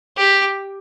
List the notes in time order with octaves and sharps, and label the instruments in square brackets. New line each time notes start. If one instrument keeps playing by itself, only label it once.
[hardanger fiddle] G4